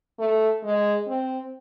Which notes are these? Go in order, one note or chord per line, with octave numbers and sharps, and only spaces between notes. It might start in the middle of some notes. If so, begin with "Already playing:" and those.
A3
G#3
C4